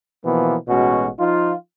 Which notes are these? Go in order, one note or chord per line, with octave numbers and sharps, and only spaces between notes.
B2 E3 F3 A#3 B3
A1 B2 G#3 C#4 F#4
F3 D#4 F4